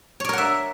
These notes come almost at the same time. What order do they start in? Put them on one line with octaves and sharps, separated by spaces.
C#5 D5 A#4 F#5 E5